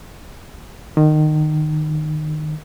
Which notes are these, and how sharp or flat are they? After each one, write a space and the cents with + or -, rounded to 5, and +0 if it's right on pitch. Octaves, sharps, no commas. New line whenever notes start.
D#3 -25